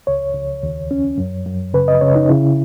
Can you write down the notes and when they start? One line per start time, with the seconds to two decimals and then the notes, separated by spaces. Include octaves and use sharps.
0.07 C#2 C#5
0.35 C#2
0.63 D#2
0.91 C#4
1.18 F#2
1.46 F#2
1.74 C#3 B4
1.88 D#5
2.01 C#3 C#5
2.16 D#4
2.29 C#3 E4